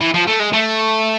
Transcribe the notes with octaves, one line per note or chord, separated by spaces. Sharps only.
E3
F3
A3
G#3
A3